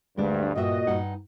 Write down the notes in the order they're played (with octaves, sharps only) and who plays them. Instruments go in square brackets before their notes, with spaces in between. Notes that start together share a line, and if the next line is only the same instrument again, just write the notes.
[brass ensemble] D2 G2 [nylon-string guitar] G#3 D4
[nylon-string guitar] G2 E5 [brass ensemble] A#2 F#4 D#5
[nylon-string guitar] G2 D#4 F#5